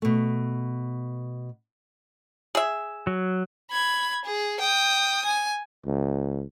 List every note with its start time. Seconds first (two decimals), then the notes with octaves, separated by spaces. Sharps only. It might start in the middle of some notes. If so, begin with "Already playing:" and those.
0.02 B2 A3
2.55 G#4 E5
3.07 F#3
3.71 B5 G#6
4.25 G#4
4.60 G5 D#6
5.25 G#5
5.86 C#2